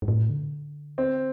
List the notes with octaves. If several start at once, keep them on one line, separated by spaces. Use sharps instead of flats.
G2
A2
D3
C4